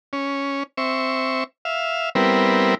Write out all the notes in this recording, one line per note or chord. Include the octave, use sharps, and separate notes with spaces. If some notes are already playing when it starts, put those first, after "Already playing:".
C#4
C4 E5 C#6
E5 F5
G3 B3 C4 E4 A#4